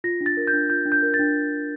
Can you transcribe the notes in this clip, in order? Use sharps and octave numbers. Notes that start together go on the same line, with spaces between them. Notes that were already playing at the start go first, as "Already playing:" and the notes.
F4 A#6
D4
A6
A#4
G6
D4
F4 G6
D4
G6
A#4
A6
D4